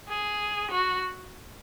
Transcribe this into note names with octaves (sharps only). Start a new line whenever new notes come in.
G#4
F#4